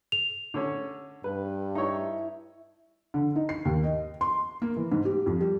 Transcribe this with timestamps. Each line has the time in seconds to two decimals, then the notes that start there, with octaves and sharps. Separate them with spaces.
0.12 F7
0.54 D3 C#4
1.24 G2 B4
1.75 D#4 E4 C#5
3.14 D3
3.35 D#4
3.49 C7
3.65 D#2
3.84 D#5
4.21 C6
4.62 A#3
4.76 E3
4.92 G#2
5.05 G4
5.26 F2
5.41 G3